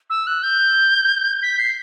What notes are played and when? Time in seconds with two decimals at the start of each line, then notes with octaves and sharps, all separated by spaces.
0.10 E6
0.27 F#6
0.43 G6
1.43 B6
1.59 C7